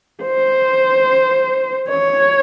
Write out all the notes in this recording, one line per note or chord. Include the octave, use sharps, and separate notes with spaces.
C5
C#5